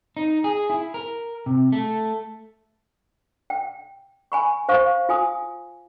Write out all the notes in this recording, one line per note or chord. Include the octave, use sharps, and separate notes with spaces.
D#4
G#4
E4
A#4
C3
A3
G5
G#5 B5 C#6
C5 F5 C#6
F4 G#5 D#6